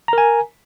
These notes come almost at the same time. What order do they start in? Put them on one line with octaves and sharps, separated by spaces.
A#5 A#4 G#5